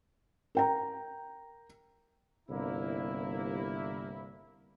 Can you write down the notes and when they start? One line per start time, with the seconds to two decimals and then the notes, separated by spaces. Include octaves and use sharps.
0.55 A#4 G5 A#5
2.49 G1 C2 A#3 E4